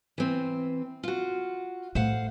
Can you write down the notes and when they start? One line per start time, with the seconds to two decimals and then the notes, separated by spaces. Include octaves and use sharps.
0.18 E3 C4
1.03 F4 F#4
1.95 A2 A3 C5 F5 F#5